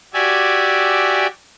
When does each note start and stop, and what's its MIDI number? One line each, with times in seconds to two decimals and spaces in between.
0.14 1.27 66
0.14 1.27 67
0.14 1.27 74
0.14 1.27 76
0.14 1.27 80